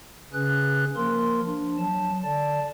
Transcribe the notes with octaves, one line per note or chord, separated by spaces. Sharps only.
C#3 C#4 G#4 B4 F#6
F3 A#3 A#4 C6
F3 D4
F#3 A5
D3 D5 A5